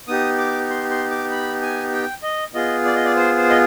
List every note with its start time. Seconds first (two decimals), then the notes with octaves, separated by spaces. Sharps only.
0.08 B3 D#4 G4 D#6
0.38 D6
0.70 C6
0.90 C6
1.11 D6
1.31 B5
1.62 G#5
1.92 G5
2.23 D#5
2.54 B3 F4 G#4 D#5
2.85 D5
2.95 D#5
3.05 D5
3.16 C5
3.37 C5
3.50 D#5